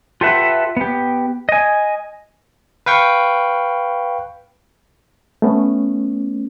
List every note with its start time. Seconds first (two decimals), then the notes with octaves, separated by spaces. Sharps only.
0.21 F4 G4 A4 B4 E5 F#5
0.77 B3 G4
1.49 D#5 G#5
2.86 B4 F5 G5 C#6
5.42 A3 B3 C#4